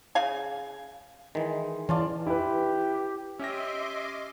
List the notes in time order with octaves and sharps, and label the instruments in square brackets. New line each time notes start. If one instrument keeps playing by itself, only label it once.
[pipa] C#3 F5 G#5
[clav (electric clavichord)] D#3 E3 [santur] G#3
[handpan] E3 [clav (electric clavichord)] C#4 F4 [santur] D5 A5 C6
[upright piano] E4 B4 [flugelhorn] G4
[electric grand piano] C#4 G4 A#6 [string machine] D#5 C6 D6 [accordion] E5